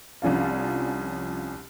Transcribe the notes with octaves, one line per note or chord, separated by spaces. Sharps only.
C2 F3 C#4 D4 F5